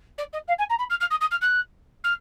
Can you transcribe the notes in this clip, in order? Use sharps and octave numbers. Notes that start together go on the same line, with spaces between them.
D5
D#5
F5
G#5
A#5
B5
F6
F6
D#6
D#6
F6
F#6
F6